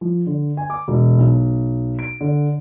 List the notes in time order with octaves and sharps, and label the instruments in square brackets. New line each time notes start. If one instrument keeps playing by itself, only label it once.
[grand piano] F3
D3
G#5
D6
E1
B1
D7
D3